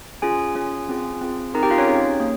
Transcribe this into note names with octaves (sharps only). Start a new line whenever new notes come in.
C#4 F4 G#4 G#5
C#4 F4 G#4
C4 F4 G#4
C4 F4 G#4
C4 D#4 G#4 A#4 A#5
G4 G5
F4 F5
C#4 C#5
C4 D#4 G#4
A#3